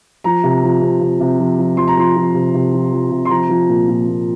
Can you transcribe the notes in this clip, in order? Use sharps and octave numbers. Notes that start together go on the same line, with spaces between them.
F3 A#5
C3
F3
C3
C3
C3
F3
F3
F3 C6
A#5
F3 C6
F3
C3
C3
F3
F3
C3
C6
F3 A#5
F3
A#2
A#2
A#2